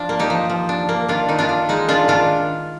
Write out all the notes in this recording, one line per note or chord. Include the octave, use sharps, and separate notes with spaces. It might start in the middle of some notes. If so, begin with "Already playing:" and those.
Already playing: F3 D4 F4
A#3
D#4 G4
F3
F3
D4
A#3
D#3 D4 F4
D#3 D#4
D4 F4
D4
G#3 D#4
D#3 D4 F4
D#3 D4 F4